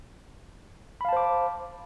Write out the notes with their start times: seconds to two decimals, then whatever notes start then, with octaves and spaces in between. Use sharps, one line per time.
1.01 B5
1.05 F5
1.09 A5
1.13 C5
1.17 D6